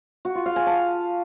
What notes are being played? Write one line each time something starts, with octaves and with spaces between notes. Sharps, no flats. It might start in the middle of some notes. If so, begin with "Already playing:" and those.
F#4
F4
F5
G#5
A5